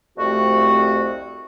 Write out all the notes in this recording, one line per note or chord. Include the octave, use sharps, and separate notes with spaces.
C2 F2 A3 C4 F#4